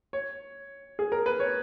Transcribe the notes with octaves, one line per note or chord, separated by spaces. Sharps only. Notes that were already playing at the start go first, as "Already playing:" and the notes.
C#5
G#4
A#4
B4
C#5